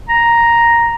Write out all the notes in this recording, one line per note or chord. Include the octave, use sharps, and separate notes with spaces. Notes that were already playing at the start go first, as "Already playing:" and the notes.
A#5